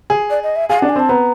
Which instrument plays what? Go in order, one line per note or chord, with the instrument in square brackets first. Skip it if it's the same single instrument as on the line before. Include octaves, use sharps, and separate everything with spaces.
[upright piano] G#4
[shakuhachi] D5
D#5
E5
[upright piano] G#4 [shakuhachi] F5
[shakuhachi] F#5
[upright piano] D4
[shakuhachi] G#5
[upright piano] C4 [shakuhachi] A5
[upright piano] B3 [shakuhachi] A#5